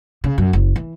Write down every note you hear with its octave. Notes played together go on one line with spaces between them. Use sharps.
C#3
F#2
F#1
E3